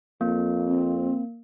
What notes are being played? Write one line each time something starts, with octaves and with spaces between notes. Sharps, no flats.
F2 A#3
C4